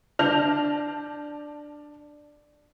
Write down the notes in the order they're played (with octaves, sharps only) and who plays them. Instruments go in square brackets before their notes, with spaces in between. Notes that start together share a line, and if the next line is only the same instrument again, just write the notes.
[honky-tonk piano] D4 A5 F6 G6 A#6 F7